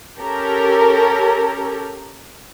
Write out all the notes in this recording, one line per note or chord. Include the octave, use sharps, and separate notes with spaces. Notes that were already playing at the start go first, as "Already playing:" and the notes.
C#4 G4 A4 A#4